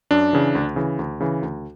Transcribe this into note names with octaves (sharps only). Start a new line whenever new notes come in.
F#2 D4
C#3 E3
D2
C#3 E3
D2
C#3 E3
D2